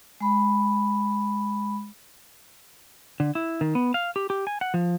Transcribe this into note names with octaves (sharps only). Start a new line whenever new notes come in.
G#3 B5
D3
E4
D#3
B3
F5
G4
G4
G#5
F#5
F3